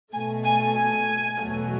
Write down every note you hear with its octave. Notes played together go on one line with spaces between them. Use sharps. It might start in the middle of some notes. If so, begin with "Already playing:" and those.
B2 A3 G#5
G#5
G#5
E2 B2 F#3 A3